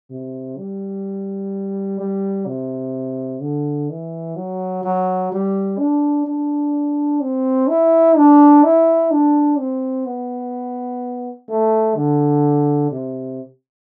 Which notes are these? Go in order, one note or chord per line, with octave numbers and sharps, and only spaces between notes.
C3
G3
G3
C3
D3
E3
F#3
F#3
G3
D4
D4
C4
E4
D4
E4
D4
C4
B3
A3
D3
C3